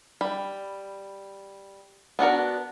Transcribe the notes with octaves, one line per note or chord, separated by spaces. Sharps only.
G3 B5
B3 D4 F#4 A#4